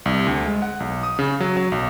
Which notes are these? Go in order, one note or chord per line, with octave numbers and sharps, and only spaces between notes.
C2
D2
G#3
F#5
B1
D#6
C#3
F#3
F#3
B1